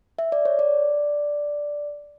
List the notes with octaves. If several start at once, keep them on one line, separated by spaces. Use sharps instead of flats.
E5
D5
C#5
D5